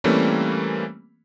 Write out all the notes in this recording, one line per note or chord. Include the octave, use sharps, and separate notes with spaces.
E3 G3 A3 A#3 C4 C#4